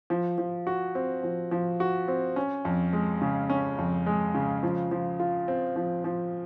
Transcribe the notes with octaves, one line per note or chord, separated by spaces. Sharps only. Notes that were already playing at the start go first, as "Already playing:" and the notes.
F3
F3
F#4
C4
F3
F3
F#4
C4
C#4
F2
G#3
C#3
C#4
F2
G#3
C#3
F3
F3
F4
C4
F3
F3